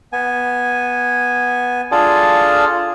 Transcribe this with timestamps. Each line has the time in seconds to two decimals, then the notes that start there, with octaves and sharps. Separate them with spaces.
0.13 B3 G#5
1.92 D4 F4 G#4 A4